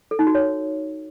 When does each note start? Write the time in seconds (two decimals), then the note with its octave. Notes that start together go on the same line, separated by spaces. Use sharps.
0.11 A4
0.19 D#4
0.27 F#4
0.35 C#5